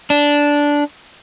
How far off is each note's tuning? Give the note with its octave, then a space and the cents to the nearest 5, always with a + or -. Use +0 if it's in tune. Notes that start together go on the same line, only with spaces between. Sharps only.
D4 -10